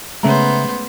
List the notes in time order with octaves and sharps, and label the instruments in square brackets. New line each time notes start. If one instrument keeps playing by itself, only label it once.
[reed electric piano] C#3 E5 A#5 [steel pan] G#3 A3 C#4 [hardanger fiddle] B3 C5